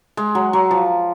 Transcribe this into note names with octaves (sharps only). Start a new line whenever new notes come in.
G#3
F#3
F#3
F3